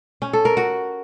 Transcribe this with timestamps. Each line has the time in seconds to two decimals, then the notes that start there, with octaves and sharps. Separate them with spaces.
0.22 C#4
0.33 A4
0.45 A#4
0.57 F#4